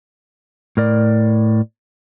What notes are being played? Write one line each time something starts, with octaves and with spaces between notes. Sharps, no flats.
A2 A#4 D5